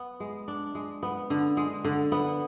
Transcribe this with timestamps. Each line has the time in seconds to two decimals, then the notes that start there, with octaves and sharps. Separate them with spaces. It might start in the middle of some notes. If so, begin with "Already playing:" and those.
Already playing: B3
0.20 G#3
0.48 D4
0.75 G#3
1.03 B3
1.30 D3
1.57 G#3
1.85 D3
2.12 B3